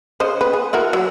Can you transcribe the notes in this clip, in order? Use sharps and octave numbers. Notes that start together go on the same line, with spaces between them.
C#3 C5 D#5
B4
G#4
E4 F#4 A#4
F#3